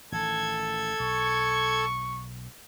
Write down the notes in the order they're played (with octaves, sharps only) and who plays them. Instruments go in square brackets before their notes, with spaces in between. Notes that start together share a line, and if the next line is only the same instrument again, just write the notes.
[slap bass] A1 D#3 [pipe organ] A4 G#6
[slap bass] B1 [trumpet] C#6